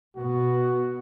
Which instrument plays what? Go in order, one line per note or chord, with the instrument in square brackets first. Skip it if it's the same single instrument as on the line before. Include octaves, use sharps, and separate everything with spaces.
[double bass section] B2 B3 [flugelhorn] F#4